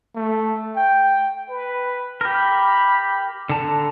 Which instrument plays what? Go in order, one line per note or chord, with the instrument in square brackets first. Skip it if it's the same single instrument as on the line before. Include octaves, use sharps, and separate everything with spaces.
[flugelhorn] A3
G5
[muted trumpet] B4
[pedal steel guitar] G4 A#4 [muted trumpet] B5
[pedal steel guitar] D3 A5 A#5